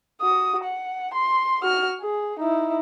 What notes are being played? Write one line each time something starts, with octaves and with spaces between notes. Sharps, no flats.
F#4 D#6
F#5
C6
F#4 F6
G#4
D#4 E4